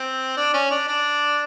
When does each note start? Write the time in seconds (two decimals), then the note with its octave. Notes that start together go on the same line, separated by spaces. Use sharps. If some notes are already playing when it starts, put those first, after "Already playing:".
Already playing: C4
0.37 D4
0.54 C#4
0.71 D4
0.88 D4